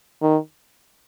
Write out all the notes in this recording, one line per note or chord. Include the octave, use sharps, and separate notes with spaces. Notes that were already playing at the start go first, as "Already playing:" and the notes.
D#3